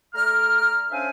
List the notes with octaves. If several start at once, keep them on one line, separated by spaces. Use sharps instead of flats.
A3 D5 A#5 F6
C#4 D4 C5 E5 F5 G#5